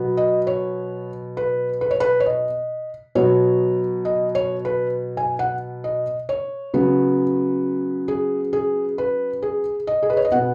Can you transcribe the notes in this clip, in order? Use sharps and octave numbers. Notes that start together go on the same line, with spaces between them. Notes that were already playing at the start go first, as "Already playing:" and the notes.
Already playing: B2 F#3 B3
D#5
C#5
B4
B4
C#5
B4
C#5
D#5
B2 F#3 B3 C#5
D#5
C#5
B4
G#5
F#5
D#5
C#5
C#3 F#3 B3
G#4
G#4
B4
G#4
D#5
G#4
B4
C#5
D#5
B2 B3 F#5